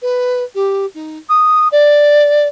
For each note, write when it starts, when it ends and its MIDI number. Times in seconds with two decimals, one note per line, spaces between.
0.02 0.44 71
0.54 0.86 67
0.94 1.18 63
1.29 1.68 87
1.72 2.47 74